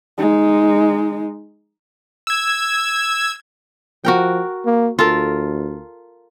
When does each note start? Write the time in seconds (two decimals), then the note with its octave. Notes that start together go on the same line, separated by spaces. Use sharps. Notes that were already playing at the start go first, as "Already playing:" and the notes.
0.18 G#3 D#4
2.27 E6 G#6
4.05 F3 F#4 A#4 G5
4.66 A#3
4.99 D2 F4 A4 A#4